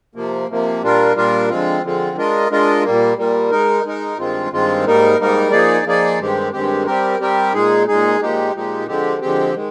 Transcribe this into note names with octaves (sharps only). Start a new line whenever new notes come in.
C3 F3 A#3
C3 F3 A#3
A#2 G3 D4 F4 A#4
A#2 G3 D4 F4 A#4
D3 F3 G#3 C4 F4
D3 F3 G#3 C4 F4
G#3 D4 F4 A#4 D#5
G#3 D4 F4 A#4 D#5
A#2 G3 A#3
A#2 G3 A#3
G#3 D#4 A#4
G#3 D#4 A#4
G2 D#3 G#3 C4 F4
G2 D#3 G#3 C4 F4
G#2 G3 A#3 D#4 A#4
G#2 G3 A#3 D#4 A#4
F3 A#3 D#4 G#4 D5
F3 A#3 D#4 G#4 D5
G2 D#3 G#3 C4 G4
G2 D#3 G#3 C4 G4
G3 C4 G4 A#4
G3 C4 G4 A#4
A#2 G#3 D#4 G#4
A#2 G#3 D#4 G#4
A#2 F3 G#3 D#4 G4
A#2 F3 G#3 D#4 G4
D3 F3 G#3 C4 G4
D3 F3 G#3 C4 G4
D#3 G#3